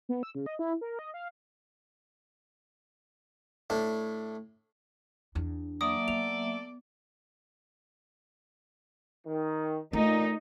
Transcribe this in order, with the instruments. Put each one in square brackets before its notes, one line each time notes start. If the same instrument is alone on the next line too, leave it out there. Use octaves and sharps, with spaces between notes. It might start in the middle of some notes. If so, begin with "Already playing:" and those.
[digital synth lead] B3
E6
C#3
D#5
E4
A#4
D#5
F5
[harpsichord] A2 D4
[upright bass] E2 D4
[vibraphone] F#3 A#3 E5 [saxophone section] A4 D5 [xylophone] D#6
[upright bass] B3 [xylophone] F7
[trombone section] D#3
[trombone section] A#2 [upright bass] A3 [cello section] D#4